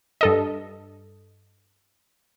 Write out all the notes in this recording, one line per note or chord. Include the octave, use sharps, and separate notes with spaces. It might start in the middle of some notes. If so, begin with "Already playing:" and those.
G2 A4 D#5